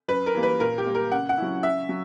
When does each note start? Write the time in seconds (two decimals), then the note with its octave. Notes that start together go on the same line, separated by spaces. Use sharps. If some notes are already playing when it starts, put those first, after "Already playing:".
0.08 F#2 B4
0.26 A#4
0.35 E3 G3 A#3
0.43 B4
0.60 A#2 A#4
0.78 G4
0.86 G3 A#3
0.95 A#4
1.12 C#3 F#5
1.29 F#5
1.38 F#3 C#4 E4
1.63 C#3 E5
1.89 F#3